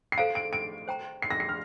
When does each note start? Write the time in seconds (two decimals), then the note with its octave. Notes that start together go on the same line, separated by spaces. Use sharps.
0.12 C7
0.17 A4 C5 F5 A#5 D7
0.35 D7
0.53 D7
0.88 C5 G5 A#5
1.22 C7
1.30 A#6
1.40 C7
1.49 F6